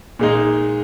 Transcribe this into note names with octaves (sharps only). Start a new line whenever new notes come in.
A#2 G#3 D#4